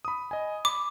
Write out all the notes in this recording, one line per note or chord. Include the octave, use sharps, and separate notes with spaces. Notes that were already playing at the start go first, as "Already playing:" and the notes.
B5 D#6
D#5 G#5
B5 D6